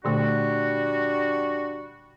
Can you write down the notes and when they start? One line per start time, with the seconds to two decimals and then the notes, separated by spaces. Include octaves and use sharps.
0.05 A#2 D3 G3 A3 D4 F#4